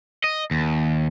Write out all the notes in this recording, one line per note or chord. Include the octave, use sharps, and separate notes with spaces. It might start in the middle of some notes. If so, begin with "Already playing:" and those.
D#5
D#2